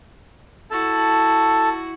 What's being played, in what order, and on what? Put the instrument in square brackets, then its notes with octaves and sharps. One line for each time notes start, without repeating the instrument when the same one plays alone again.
[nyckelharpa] E4 F#4 [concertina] A4 A5